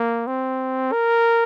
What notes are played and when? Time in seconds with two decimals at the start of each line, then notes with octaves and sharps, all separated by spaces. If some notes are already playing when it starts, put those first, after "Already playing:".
Already playing: A#3
0.27 C4
0.92 A#4